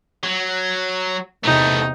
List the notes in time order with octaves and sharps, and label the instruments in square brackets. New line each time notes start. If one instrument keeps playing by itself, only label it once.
[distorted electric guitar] F#3
[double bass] E2 C3 [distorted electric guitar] A3 B3 [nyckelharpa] D#4